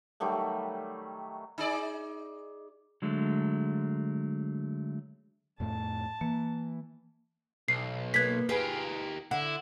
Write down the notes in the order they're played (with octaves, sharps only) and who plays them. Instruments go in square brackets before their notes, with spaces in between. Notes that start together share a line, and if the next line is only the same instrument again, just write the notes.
[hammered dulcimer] D#3 F#3 G3 A3
[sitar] D#4 G#4 D5
[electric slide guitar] D3 F#3 G#3 A3
[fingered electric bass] F2 A2 A3 [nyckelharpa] A5
[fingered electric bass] E3 [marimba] A#3
[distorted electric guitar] B1 [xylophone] C7
[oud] A#3 B3 [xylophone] G#6 B6
[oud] F4 G#4 B4 [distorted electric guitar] G4 A#4
[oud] D3 [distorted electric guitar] E4 [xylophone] F#5